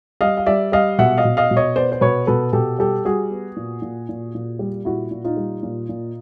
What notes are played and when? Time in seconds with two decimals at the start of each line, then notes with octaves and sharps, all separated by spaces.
0.21 G3 D#5 F5
0.37 F5
0.46 G3 D5 E5
0.72 G3 D#5 F5
0.99 B2 E5 F#5
1.18 D#5 F5
1.25 B2
1.37 D#5 F5
1.51 B2
1.57 C#5 D#5
1.76 B3 C5 D5
1.92 C5
2.01 B2 B4 C#5
2.27 B2 A4 B4
2.53 B2 G4 A4
2.79 G3 G4 A4
3.05 G3 F#4 G#4
3.31 B3
3.56 A#2
3.82 A#2
4.09 A#2
4.35 A#2
4.59 G3
4.85 A#2 E4 F#4
5.11 A#2
5.24 D#4 F4
5.37 G3
5.63 A#2
5.89 A#2